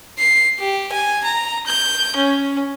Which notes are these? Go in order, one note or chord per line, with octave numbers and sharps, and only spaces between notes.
C7
G4
G#5
A#5
G6
C#4